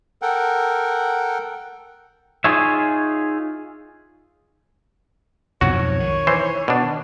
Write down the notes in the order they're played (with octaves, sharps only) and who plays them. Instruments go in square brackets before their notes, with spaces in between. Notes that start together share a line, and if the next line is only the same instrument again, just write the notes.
[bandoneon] A4 A#4 F#5 G5
[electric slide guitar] D#4 F4 G#4 C#5 E5
[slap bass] B1 F2 G#2 [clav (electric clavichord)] F#4 [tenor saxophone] C#5
[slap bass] D#3
[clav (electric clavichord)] E3 C5
B2 D4